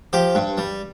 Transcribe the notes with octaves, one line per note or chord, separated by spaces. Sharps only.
F3 G4
G2
G3